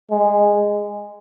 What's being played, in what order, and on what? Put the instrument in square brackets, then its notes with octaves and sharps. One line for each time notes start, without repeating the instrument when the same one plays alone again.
[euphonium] G#3